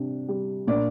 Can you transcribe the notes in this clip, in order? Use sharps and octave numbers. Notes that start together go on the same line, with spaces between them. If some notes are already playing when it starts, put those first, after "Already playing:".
Already playing: C3 G3 D4
G3
A#2 D4 D5